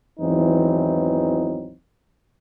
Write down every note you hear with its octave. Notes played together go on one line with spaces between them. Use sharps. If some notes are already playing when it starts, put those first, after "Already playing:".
G#1 E2 E3 F#3 C4 D#4